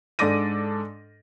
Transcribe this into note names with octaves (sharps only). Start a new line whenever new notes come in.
G#2 D4 A4 D6 A#6 D#7